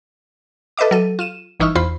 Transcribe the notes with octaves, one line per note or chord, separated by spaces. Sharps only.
A4 B4 D#5 E5 D6
F#3 A4 D#7
F4 D#7 E7
G1 E3 D#4 C#6 E6 F6
E2 F4 C5 B5